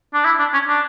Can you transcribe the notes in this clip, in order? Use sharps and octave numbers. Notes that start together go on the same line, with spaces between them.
D4
E4
D4
C#4
D4